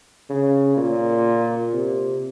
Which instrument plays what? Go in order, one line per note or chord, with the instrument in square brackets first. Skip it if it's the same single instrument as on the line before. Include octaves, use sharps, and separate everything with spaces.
[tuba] C#3
A#2
C3